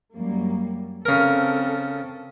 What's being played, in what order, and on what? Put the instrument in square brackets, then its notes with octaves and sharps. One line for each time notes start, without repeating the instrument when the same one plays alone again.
[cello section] F#2 G3 A#3
[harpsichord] C#3 A#4 [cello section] C4 A4